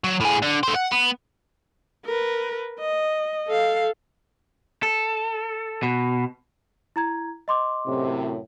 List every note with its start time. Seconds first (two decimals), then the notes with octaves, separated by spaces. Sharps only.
0.04 F#3
0.20 A2 G#4
0.42 D3
0.63 A3 C5
0.75 F#5
0.92 B3
2.06 A#4 B4
2.79 D#5
3.48 A4 F5
4.83 A4
5.83 B2
6.96 E4 A#5 G#6
7.48 D#5 C6 D6
7.87 F#2 A2 C3